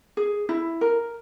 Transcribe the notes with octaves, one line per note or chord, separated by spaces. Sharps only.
G#4
E4
A#4